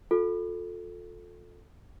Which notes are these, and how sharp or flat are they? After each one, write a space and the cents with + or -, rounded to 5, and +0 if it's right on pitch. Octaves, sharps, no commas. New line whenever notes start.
F4 +35 A4 +0